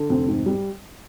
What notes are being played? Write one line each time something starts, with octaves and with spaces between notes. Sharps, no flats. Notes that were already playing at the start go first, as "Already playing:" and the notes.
Already playing: D3
F1 C4
G#2
G3